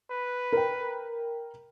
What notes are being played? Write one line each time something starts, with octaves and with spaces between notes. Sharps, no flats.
B4
A#4 G5